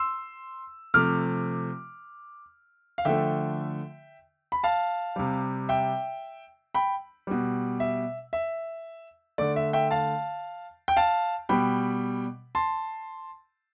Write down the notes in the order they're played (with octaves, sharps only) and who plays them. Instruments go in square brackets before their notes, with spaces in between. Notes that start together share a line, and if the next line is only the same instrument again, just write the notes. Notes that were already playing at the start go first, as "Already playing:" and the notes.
Already playing: [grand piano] C6 E6
C3 F3 A3 D6 F6
F5
D3 F3 A3 E5 G5
B5
F5 A5
C3 G3
E5 G5
G5 B5
B2 G3
E5
E5
D3 A3 D5
E5
E5 G5
F5 A5
G5
F5 A5
B2 G3 G5 B5
A5 C6